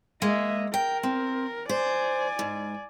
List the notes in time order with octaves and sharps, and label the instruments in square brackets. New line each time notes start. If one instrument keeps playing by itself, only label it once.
[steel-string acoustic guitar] G#3 A#3 [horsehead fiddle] D#5 E5
[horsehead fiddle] A#4 [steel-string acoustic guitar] G5
[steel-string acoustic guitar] C4
[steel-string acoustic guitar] C5 [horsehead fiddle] D5 G#5
[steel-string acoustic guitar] G#2